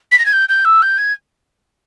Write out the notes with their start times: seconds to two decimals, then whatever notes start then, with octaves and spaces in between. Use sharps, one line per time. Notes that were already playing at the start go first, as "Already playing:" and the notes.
0.11 B6
0.18 A#6
0.25 G#6
0.32 G6
0.48 G6
0.64 E6
0.82 G6
0.97 G#6